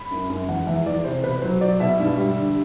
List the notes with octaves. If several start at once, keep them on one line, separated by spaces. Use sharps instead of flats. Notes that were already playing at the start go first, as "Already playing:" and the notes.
Already playing: B5
F#2
F#2
E2 F#5
E2 E5
E2 D5
C3 C5
B2 B4
F#3 C5
F#3 D5
B2 E5
G2
G3
D3